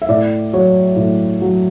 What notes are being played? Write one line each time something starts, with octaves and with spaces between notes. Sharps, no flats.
E5
A2 D5
F#3 C#5
A2
F#3